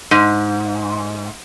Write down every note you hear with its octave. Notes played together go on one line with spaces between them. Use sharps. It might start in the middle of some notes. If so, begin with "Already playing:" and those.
G#2